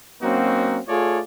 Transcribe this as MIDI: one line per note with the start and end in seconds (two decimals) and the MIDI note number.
0.22 0.78 54
0.22 0.78 58
0.22 0.78 60
0.22 0.78 61
0.22 0.78 63
0.22 0.78 66
0.88 1.20 57
0.88 1.20 65
0.88 1.20 68
0.88 1.20 69
0.88 1.20 73
0.88 1.20 74